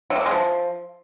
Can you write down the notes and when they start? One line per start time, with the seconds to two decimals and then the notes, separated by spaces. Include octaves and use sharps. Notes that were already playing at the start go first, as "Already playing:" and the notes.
0.10 F#3
0.16 A#3
0.21 F#3
0.26 G#3
0.31 F3